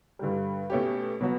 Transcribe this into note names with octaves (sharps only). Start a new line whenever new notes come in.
G2 D3 G3
B2 A3 C#4 G4
B2 F#3 B3 F#4